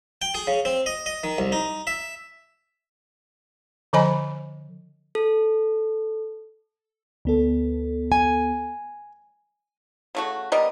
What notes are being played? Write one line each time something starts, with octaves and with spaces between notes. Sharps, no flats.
G5
G#4
C#3
C4
D#5
D#5
D#3
C2
D#4
E5
D3 F3 C5 D#5 G#5 B5
A4
D2 B3 A4
G#5
C#3 A3 F#4
G3 B3 A#4 D#5